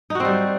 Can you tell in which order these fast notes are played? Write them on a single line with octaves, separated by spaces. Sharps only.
D#4 F#4 C4 G3